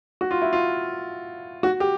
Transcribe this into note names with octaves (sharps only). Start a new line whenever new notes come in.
F#4
F4
E4
F4
F#4
G4